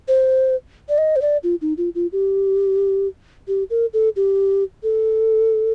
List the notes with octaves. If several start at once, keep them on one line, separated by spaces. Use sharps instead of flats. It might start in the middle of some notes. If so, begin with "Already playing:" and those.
C5
D5
D#5
C5
D5
F4
D#4
F4
F4
G4
G4
A#4
A4
G4
A4